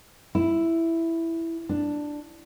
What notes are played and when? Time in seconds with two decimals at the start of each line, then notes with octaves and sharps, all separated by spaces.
0.35 E4
1.69 D4